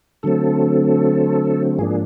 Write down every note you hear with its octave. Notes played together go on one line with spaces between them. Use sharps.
D3 F#3 A3 C4 A4
G#2 F3 A#3 D4 G#4